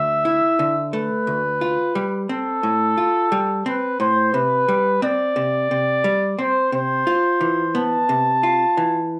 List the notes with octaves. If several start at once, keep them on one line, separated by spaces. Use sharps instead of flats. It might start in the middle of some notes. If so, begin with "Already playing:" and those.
Already playing: D2 E5
E4
D3
A3 B4
D2
F4
G3
C4 A4
A2
F4
G3
C4 B4
A2 C5
C3 B4
G3
C4 D5
C3
C3
G3
C4 C5
C3 C5
F4
E3
B3 A5
C3
F4
E3